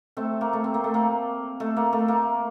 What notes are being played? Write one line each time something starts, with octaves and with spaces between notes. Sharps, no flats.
A3 C4
A#3
A3
C4
A#3
A3
A#3
A3
A#3
A3
A#3